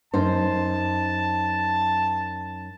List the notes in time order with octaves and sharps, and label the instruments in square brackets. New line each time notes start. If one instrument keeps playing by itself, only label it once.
[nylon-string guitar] F#2 D#4 C5 [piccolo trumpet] A5